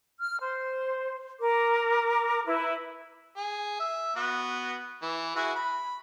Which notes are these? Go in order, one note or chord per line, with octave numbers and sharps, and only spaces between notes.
F6
C5
A#4 D6
E4 B4
G#4
E5
B3 F#4
E3
E4 F#4 G#4
B5